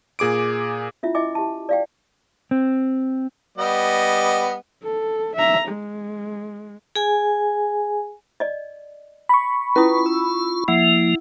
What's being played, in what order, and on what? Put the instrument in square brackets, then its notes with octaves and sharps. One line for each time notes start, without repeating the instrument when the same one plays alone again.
[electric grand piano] A#2 G#4 D6 D7
[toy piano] C#4 E4 F4 E5
E4 D#5 E5 G#5 D6
G4 A5
D5 F5 G5
[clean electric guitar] C4
[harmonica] G3 B3 D#5
[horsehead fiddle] A4
E5 A#5
G#3
[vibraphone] G#4 G#5
[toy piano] D5 D#5
[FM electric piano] B5 C#6
[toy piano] C#4 E4 D#6 [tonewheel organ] F4 [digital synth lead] B4
[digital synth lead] E6
[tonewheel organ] F3 A#3 [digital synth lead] E4 [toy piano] F#5